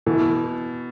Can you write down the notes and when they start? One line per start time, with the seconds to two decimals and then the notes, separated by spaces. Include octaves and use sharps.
0.06 B2 E3